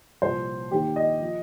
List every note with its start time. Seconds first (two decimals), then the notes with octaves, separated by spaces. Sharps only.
0.22 C2 A#2 F3 C5
0.71 D#2 D#3 G4
0.96 D#5
1.21 F3